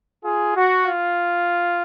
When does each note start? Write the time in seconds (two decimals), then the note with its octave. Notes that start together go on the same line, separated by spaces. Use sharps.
0.23 F4 G#4
0.54 F#4
0.87 F4